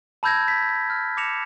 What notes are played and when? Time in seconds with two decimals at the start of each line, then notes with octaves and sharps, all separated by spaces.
0.23 A5 B5 E6 G6 G#6 A#6
0.48 B6
0.90 F6
1.17 D6 A#6 C#7 E7 F7